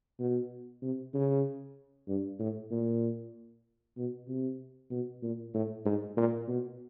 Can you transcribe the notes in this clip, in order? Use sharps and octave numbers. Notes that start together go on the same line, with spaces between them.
B2
C3
C#3
G2
A2
A#2
B2
C3
B2
A#2
A2
G#2
A#2
B2